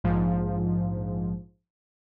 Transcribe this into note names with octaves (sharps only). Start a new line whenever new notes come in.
A#1 G#2 F3